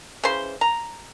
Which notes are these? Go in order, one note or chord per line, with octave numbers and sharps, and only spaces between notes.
C#3 E3 C5 C6
A#5